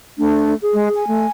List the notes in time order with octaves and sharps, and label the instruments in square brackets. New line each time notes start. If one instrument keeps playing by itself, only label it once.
[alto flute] A3 [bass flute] D4
[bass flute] G#4
[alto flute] G#3
G#5
[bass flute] A3